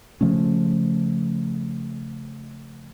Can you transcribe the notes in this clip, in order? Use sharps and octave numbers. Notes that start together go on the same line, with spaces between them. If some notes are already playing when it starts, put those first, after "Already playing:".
C#3 F3 A3 C#4